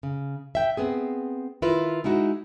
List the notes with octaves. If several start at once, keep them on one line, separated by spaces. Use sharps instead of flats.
C#3
E5 G5
B3 C4 G#4
D#3 E4 F4 A#4 B4
G#3 D#4 E4 F#4